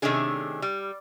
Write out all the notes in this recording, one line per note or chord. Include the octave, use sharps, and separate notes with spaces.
C3 D#3 A3 C#4 D4 G#4
G3